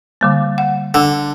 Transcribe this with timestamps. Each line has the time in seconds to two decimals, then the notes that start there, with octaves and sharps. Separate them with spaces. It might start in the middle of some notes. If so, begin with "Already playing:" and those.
0.21 D3 G3 A#3
0.58 F#5
0.94 D3 E6